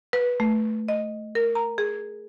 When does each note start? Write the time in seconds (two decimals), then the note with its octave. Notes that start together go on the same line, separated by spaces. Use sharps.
0.13 B4
0.40 A3
0.88 D#5
1.35 A#4
1.55 A#5
1.78 G#4